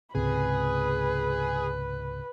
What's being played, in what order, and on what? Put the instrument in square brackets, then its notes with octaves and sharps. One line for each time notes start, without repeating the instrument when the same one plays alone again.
[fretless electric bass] C#2 G#2 C3 [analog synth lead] G#4 [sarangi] B4